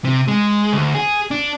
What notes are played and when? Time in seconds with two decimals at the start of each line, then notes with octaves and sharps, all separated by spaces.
0.05 C3
0.28 G#3
0.73 D2
0.95 G#4
1.31 D4